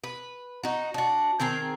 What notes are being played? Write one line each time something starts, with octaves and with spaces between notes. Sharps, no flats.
B4
D#4 F#4
D4 F#4
D#3 C4 G#4 A#4